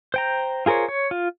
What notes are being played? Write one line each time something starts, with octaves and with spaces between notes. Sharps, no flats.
C5 G5 A#5
F4 G#4 A#4 C5 C#5
C#5
F4